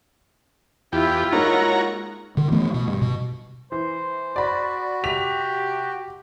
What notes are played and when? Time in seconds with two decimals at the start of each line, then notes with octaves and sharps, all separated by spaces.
0.93 E2 E4 F4 G4
1.32 G#3 A#3 D#4 F#4 C#5 A#5
2.37 D3 D#3
2.52 E3 A3 B3
2.74 B2
2.87 G2
3.02 B2
3.72 E3 C5
4.36 F#4 D5 B5
5.04 C3 G4 B6 F7